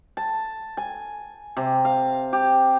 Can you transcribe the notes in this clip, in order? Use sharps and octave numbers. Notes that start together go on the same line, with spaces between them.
A5
G#5
C3
F5
G4